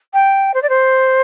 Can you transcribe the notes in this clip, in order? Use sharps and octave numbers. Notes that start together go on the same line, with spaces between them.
G5
C5
D5
C5